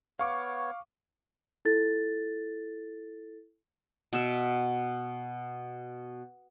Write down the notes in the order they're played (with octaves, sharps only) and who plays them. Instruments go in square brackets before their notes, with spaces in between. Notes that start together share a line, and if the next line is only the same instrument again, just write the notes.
[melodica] B3 C#5 [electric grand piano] F5 C#6 D6
[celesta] E4 F4 A4 A6
[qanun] B2 E5